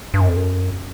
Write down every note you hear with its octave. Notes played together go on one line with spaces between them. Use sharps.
G2
F#2
F2
F#2